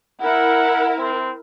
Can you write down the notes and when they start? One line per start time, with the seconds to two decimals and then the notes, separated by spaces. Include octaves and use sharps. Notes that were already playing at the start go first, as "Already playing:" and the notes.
0.20 E4 A#4 F#5
0.97 C4